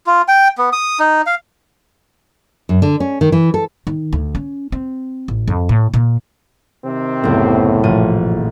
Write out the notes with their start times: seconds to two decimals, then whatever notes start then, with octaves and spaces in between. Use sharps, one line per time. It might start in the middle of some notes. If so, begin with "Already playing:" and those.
0.07 F4
0.28 G5
0.58 B3
0.73 D#6
0.99 D#4
1.26 F5
2.69 F#2
2.82 D3
3.00 C#4
3.21 D#3
3.32 E3
3.54 A4
3.87 D#3
4.13 D2
4.35 C#4
4.72 C4
5.28 A1
5.48 F2
5.69 A2
5.94 A#2
6.84 C3 D#3 C4
7.24 F#1 C2 A2 B3
7.84 A1 A#2 F3 D#7